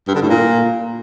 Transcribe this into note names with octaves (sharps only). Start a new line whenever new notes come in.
G2
D3
A2
A#2